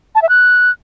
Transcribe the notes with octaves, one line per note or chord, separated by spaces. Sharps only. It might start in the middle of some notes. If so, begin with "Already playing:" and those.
A5
E5
F#6